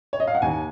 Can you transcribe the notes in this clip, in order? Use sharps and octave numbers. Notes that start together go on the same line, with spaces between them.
C#5
D#5
F5
F#5
D#2 G#5